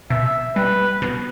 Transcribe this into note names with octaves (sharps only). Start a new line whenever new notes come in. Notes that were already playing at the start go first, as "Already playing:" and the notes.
B2 E5
G3 B4
B2